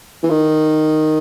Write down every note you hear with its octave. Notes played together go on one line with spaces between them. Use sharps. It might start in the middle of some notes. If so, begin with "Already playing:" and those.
E3
D#3